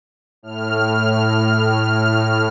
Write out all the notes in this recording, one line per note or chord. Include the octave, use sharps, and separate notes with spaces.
A2 F6